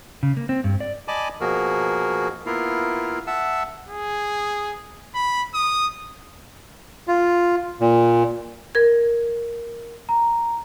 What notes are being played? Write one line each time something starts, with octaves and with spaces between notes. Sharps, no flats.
C#3
A#3
C4
G2
D5
D5 D#5 G#5 A5 B5 D6
B2 F3 A#3 F#4 G#4 A#4
A#3 B3 E4 F4 A#4 F5
E5 F#5 A5 E6
G#4
B5
D#6
F4
A#2
A#4 G#6
A#5